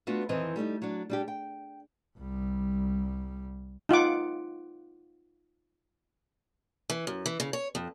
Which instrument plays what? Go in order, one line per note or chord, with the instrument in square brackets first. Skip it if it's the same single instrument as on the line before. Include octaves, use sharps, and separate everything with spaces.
[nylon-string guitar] A3 B3 D4 F4 F#4
F2 D#3 E3 C4 B4 D#5
G3 A3 C#4 D#4
F#3 D4
G3 D4 G4
G5
[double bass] C2 G3
[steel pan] D#4 F4 F#5 D6
[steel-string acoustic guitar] E3
F#2
E3
C#3
C#5
F2